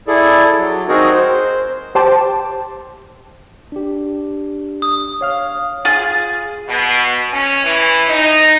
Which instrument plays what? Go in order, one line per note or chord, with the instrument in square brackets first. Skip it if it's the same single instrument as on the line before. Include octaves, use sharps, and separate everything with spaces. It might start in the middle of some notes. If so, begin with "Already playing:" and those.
[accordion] E4 G#4 A4 D5
F#3
C4 D#4 F#4 G#4 A#4
C5
[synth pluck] G4 C5 G5 A5 D6
[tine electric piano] D4 G4
[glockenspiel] D#6
[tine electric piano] C#5 F5 F6
[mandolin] F4 G#4
[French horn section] B2
C#4
E3
D#4